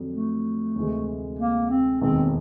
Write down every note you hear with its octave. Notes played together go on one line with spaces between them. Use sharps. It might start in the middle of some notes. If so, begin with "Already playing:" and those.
Already playing: F2 D3 F#3
A3
D2 C3 E3 G#3
A#3
C4
E1 D#2 D#3 G#3 C4